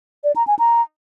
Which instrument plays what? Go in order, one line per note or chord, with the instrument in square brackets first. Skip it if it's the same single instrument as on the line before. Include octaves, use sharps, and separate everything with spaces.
[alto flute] D5
A#5
G#5
A#5